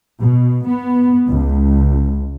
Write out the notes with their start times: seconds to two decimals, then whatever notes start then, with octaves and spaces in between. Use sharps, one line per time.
0.21 B2
0.66 B3
1.29 C#2